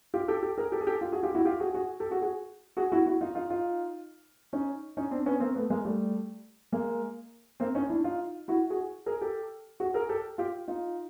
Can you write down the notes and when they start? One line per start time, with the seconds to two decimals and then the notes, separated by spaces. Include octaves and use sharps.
0.14 F4 G4
0.28 G4 A4
0.43 G4 A4
0.58 G#4 A#4
0.72 G4 A4
0.81 G#4
0.87 G4 A4
1.01 F4 G4
1.12 F#4 G#4
1.23 F4 G4
1.34 E4 F#4
1.45 F4 G4
1.60 F#4 G#4
1.74 F#4 G#4
2.00 G4 A4
2.11 F#4 G#4
2.22 F#4 G#4
2.77 F#4 G#4
2.92 E4 F#4
3.06 E4 F#4
3.21 D#4 F4
3.35 D#4 F4
3.50 D#4 F4
4.53 C#4 D#4
4.97 C#4 D#4
5.11 C4 D4
5.26 B3 C#4
5.40 A#3 C4
5.55 A3 B3
5.70 G#3 A#3
5.85 G3 A3
6.72 G#3 A#3
7.60 A#3 C4
7.75 C#4 D#4
7.90 D4 E4
8.04 D#4 F4
8.48 E4 F#4
8.70 F#4 G#4
9.06 G#4 A#4
9.21 G4 A4
9.80 F#4 G#4
9.94 G#4 A#4
10.09 G4 A4
10.38 F4 G4
10.68 D#4 F4